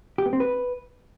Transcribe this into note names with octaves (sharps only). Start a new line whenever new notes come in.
G4
B3
C4
B4